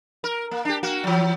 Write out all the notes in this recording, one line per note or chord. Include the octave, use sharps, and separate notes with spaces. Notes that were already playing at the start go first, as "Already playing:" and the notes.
A#4
A#3
D4 G4
A#3 F#4
E3 F#3